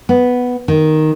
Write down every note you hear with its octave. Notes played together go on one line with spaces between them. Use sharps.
B3
D#3